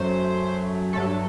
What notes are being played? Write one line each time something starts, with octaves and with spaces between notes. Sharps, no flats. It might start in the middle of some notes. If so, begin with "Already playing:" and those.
Already playing: F#2 F#3 A3 C5
G2 F#3 A3 A4